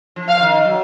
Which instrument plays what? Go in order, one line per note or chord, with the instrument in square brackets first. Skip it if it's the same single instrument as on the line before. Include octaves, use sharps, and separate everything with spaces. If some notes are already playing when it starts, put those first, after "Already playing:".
[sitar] F3
[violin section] F5
[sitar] D#3
F#3